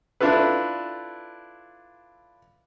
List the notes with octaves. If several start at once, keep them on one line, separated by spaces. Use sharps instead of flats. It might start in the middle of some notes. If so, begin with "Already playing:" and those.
D4 E4 F4 A4 B4